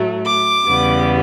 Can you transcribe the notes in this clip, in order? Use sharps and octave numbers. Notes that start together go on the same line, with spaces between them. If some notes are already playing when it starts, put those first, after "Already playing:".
Already playing: A2 F#3 A3
D6
E2 C#3 G3 B3